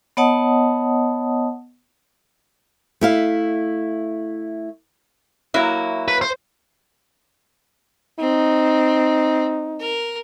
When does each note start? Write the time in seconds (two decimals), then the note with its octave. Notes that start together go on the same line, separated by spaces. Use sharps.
0.17 B3 C#5 D#5 F#5 A5 D#6
3.01 A3 E4 F5
5.54 F#3 A#3 E4
6.08 B4
6.21 C5
8.19 C4 D#4
9.80 A#4